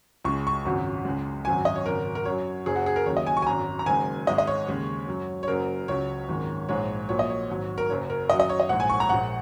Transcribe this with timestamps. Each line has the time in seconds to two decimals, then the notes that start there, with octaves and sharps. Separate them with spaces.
0.24 C#2 C#3 G#3 C#6
0.47 C#6
0.65 G#1 F#2 C#3 F#3
1.05 C#2 C#3 G#3
1.45 G#1 F#2 F#3 G#5
1.65 D#5
1.76 C#5
1.86 G#1 F#2 C#3 A#4
2.15 A#4
2.25 F#2 F#3 C#5
2.66 F#1 F#2 F#3 G#4
2.76 F#4
2.86 G#4
2.96 A#4
3.06 D#2 C#3 F#3 C#5
3.17 D#5
3.26 G#5
3.37 C#6
3.42 G#5
3.47 G#1 F#2 F#3 A#5
3.79 A#5
3.86 F#1 F#2 D#3 G#3 G#5
4.27 G#1 G#2 G#3 D#5
4.38 D#5
4.47 C#5
4.67 D#2 C#3 G#3
5.08 F#2 F#3
5.43 C#5
5.48 F#1 F#2 F#3 A#4
5.88 C#2 C#3 F#3 C#5
6.29 G#1 F#2 D#3 G#3
6.69 A#1 G#2 G#3 C#5
7.08 A#1 A#2 F#3 C#5
7.19 D#5
7.30 C#5
7.49 G#1 G#2 F#3
7.78 A#4
7.89 F#1 F#2 C#3 C#5
8.10 A#4
8.30 F#2 D#3 F#3 D#5
8.40 D#5
8.49 C#5
8.60 D#5
8.69 A#1 G#2 G#3 F#5
8.80 G#5
8.90 C#6
9.00 A#5
9.09 A#1 A#2 G#3 F#5